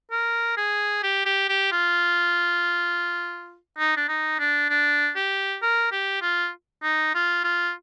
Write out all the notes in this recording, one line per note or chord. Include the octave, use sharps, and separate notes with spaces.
A#4
G#4
G4
G4
G4
F4
D#4
D4
D#4
D4
D4
G4
A#4
G4
F4
D#4
F4
F4